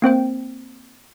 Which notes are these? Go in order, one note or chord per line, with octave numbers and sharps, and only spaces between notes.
A#3 C4 C5 G5